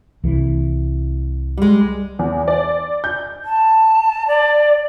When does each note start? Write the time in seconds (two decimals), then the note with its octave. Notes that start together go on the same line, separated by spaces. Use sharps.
0.24 C2 E3
1.58 G3 G#3
2.19 E2
2.48 D5
3.04 G6
3.45 A5
4.28 D5